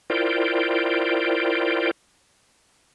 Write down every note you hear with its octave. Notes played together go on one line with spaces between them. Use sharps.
E4 F4 A#4 C5 D5 G5